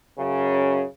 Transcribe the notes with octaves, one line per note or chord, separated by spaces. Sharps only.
F#2 C#3